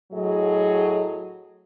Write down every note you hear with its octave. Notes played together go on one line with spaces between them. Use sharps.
A2 F#3 G#4 D#5